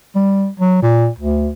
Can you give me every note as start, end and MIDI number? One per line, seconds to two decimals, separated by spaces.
0.15 0.48 55
0.59 0.82 54
0.82 1.07 46
1.19 1.50 38